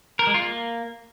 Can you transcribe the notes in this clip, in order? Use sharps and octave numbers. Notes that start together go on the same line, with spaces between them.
A#4
G#3
F4
A#3